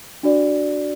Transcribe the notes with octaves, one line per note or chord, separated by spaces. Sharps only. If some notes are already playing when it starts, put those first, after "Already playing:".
D4 F#4 D5